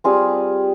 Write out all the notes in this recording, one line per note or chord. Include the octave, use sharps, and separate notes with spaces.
G3 C4 F4 G#4